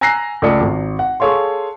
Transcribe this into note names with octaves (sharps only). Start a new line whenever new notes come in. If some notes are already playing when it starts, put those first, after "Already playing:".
G#5 A#5 E6 F#6 A#6 C7
C#2 A3 A4 D5 D#6 C#7
G#1
F#5
G#4 A4 C#5 F5 C6